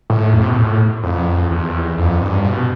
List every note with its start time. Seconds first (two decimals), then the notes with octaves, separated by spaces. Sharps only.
0.10 A2
0.33 F2
0.42 C3
0.49 B2
0.57 A2
1.03 F2
1.51 E2
1.98 F2
2.22 G2
2.45 B2